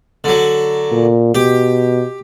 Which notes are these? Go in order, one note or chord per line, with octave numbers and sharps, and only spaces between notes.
D3 F#3
A#2
B2 G4